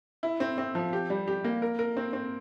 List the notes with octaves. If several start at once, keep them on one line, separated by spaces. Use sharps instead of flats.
E4
C4
C4
F3
G4
G3
G4
A#3
A#4
A#4
C4
C4